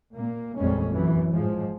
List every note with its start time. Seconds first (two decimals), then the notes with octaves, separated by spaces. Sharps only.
0.14 A#2 A#3
0.57 A1 F2 A#2 G3 G#3 C#4
0.91 F#2 E3
1.33 G#2 F3 G#3